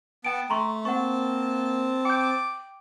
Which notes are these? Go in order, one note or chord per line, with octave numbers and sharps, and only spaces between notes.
B3 G5 A5 D7
A3 A#5 C6 C#6
A#3 C4 F#5 A5 C#6
G5 D6 G6